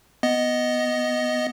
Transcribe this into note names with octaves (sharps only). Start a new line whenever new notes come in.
B3 D#5